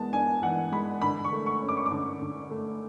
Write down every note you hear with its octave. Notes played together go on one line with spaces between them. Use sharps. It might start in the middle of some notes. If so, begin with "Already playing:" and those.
Already playing: E3 G#3 B3 A5
D4 G#5
E3 F#5
G#3 B5
D3 B5
C#6
A3
C#6
C#4
D6
C#6
D6
D3
D3
A3